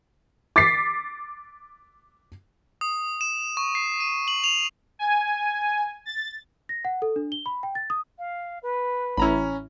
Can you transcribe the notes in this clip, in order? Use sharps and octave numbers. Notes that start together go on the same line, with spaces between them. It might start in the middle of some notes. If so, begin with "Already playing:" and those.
D6 A6 B6 C7
D#6
E7
C#6
C7
D#7
F#7
F7
G#5
A6
A#6
F#5
A4
D4
G7
B5
G5
A6
D#6
F5
B4
A1 C#4 E4 A#5 B5